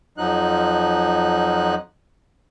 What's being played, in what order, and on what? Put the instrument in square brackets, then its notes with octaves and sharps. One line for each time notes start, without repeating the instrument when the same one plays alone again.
[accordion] F2 F3 F#3 D#4 F#6